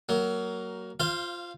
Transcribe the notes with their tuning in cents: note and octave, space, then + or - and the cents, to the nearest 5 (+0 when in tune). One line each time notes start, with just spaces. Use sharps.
F#3 +20 A#3 +0
F4 +0 C5 +0 F5 -25